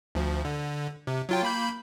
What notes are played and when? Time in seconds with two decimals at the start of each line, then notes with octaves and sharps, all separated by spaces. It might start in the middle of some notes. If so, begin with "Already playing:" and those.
0.15 D2 F3
0.45 D3
1.07 C3
1.29 F#3 F4 G5
1.43 A#3 B5 G6